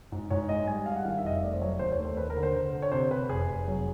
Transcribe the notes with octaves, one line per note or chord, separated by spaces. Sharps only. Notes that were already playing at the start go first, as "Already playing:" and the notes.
G#2
G#2 C#5
G#3 D#5
G3 G#5
G3 F5
F#5
D#3 F5
E5
F1 D#5
E5
A3 D5
C5
F#3 C#5
D#2 C5
C#5
A3
C5
D#2 B4
A#4
D3
C5
D3
D3
C#5
C3 C5
C3 B4
F1 G#4
F1
F#3